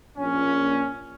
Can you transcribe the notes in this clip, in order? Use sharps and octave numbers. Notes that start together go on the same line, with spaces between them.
A#1 A#2 C#4